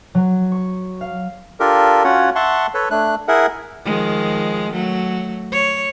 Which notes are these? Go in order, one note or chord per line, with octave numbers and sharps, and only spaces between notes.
F#3
C#6
F5
D4 F4 G4 A4 A#4
C#4 F4 F#4 C#5 F#5
E5 F#5 A5 C6 C#6
A4 B4 C#5
A3 D4 F#6
E4 G#4 A#4 E5 F#5
D#3 F3 G#3
F#3 A3
C#5